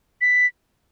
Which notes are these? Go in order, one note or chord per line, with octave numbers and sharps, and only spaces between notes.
B6